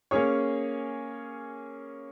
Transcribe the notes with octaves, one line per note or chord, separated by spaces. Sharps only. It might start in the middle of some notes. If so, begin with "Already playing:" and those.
A#3 C#4 G#4 C#5